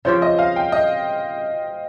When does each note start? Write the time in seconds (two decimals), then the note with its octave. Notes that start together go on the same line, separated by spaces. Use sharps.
0.05 C#3 F3 C4 G4 C5
0.22 D#5
0.39 F5
0.56 G5
0.72 D#5